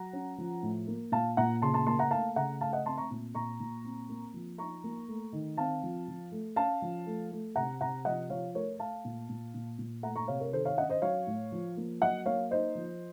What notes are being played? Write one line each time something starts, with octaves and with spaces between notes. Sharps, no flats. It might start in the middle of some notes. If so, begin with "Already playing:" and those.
Already playing: F#3 F#5 A#5
C#4
F3
A2
A#3
A#2 F5 A5
A#2 F#5 A#5
C#3 A5 C6
A5 C6
A#3 A5 C6
F#5 A#5
A3 F5 A5
C#3 F#5 A#5
A3 F5 A5
D#5 F#5
C4 A5 C6
A#5 C#6
A#2
A#2 A#5 C#6
A#2
C4
A#3
F3
D#4 A#5 C#6
A#3
A3
D#3
C4 F5 A5
F3
F3
A3
C#4 F5 A5
F3
A3
A3
C3 F#5 A#5
C3 F#5 A#5
F3 D#5 F#5
F3 C#5 F5
A3 A#4 C#5
A3 F5 A5
A#2
A#2
A#2
A#2
A3 F#5 A#5
A#5 C#6
C3 C#5 F5
A#4 C#5
D#3 A4 C5
C#5 F5
C#4 D#5 F#5
C5 D#5
F#3 C#5 F5
A2
F3
A#3
F#3 D#5 F#5
A#3 C#5 F5
D#4 C5 D#5
F3